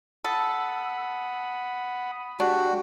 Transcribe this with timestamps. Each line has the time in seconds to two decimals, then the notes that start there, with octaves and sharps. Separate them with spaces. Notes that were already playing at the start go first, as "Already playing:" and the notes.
0.24 A4 F#5 B5 D#6
2.40 G#3 D4 F#4 G4